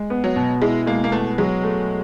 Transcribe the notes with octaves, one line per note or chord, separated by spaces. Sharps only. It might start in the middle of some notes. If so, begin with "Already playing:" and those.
Already playing: G#3
B3
F#3
B2
G#3 E4
G#3 A#3
A#3
A3 B3
F#3 G#3
A3